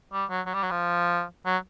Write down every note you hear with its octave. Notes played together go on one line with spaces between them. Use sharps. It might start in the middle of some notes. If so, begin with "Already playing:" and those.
G3
F#3
F#3
G3
F#3
F3
F#3